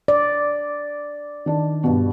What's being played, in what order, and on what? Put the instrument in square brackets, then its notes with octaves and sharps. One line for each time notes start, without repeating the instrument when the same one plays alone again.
[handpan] D5
[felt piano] D#3 D4
G2 B2